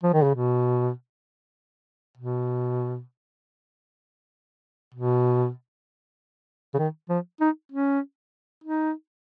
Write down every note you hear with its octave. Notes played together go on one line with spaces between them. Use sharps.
F3
D#3
C#3
B2
B2
B2
C#3
D#3
F3
D#4
C#4
D#4